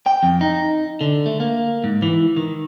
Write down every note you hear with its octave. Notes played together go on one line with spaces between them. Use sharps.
G5
F2
D#4
D3
A3
A#3
G#2
E3
D#3